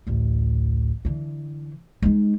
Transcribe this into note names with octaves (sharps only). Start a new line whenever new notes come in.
A1 D2
D3 E3
G#3 D#4